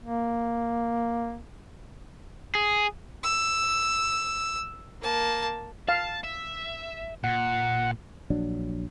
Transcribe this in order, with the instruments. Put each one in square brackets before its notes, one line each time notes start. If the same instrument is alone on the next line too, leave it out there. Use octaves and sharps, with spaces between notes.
[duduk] A#3
[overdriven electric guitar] G#4
[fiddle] E6
A#3 A5
[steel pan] F5 [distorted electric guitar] A5
[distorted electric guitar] E5
[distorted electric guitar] A#2 [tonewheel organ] F#5
[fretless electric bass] A#1 F#3 D4